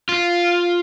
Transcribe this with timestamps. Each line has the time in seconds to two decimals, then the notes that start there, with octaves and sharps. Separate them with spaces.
0.09 F4